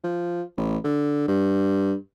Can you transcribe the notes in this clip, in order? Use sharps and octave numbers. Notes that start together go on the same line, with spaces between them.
F3
A1
D3
G2